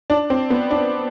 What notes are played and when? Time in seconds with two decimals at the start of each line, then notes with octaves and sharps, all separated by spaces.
0.10 D4
0.30 C4
0.50 B3
0.71 D4